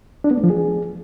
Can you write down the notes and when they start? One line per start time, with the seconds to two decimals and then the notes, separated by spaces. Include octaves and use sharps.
0.24 D4
0.31 B3
0.37 A3
0.44 F3
0.50 G#4